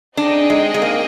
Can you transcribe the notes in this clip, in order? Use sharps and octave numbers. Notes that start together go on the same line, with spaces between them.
C4 D4 D#4 G#4 D#5 G5
G#3
G#3
A#3